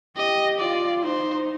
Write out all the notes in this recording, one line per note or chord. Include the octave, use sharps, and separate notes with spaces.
G4 D#5
F4 D5
D#4 C5